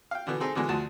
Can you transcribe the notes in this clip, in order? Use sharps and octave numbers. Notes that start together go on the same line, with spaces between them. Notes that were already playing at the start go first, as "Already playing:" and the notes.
F5 G5
B2 D3 E3 B3
C4 D#4 G#4 A4
B2 D3 E3 G#3
D2 F3 F#4 A5